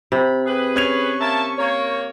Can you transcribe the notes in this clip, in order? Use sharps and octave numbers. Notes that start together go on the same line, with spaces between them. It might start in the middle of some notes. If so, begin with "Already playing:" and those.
C3 B5
G4 G#4 B4
C#4 C#6 G#6 F7
A#3 E5 A5
A#3 C#5